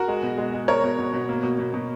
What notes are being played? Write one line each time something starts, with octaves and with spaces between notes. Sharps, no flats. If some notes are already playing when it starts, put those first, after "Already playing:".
Already playing: F#4 A#4
G#3
B2
G#3
G#3
B2 A#4 C#5
B2
B2
B2
A#3
B2
B2
B2